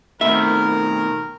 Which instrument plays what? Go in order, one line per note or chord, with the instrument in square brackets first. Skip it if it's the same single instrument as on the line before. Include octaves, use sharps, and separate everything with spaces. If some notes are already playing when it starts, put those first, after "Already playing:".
[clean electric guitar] B2 D#3 [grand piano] A3 C4 [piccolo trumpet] A#4 [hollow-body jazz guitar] E5